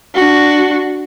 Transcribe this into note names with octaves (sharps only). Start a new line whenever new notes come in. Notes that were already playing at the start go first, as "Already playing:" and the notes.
D4 F#4